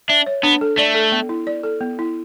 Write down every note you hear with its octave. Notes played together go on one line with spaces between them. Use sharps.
D4 E5
C#5
B3 D4
A4
A3 D5
A4
B3
E4
D5
A4
B3
E4